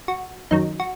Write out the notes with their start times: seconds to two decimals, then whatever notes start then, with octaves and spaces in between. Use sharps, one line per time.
0.08 F#4
0.51 F#2 D#3 F#3 D#4
0.80 F#4